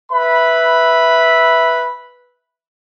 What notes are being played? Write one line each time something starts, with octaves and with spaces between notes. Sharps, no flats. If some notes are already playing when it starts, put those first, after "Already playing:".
B4 E5 B5